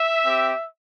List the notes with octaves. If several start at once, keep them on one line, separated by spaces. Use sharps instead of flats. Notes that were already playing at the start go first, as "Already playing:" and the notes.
Already playing: E5
C4 G4